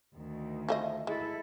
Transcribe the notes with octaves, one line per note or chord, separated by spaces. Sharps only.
D2 D#3
F3 A3 D#5
G#3 E4 A4